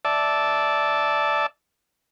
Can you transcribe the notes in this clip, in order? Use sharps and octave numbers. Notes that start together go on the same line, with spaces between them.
D5 E5 A5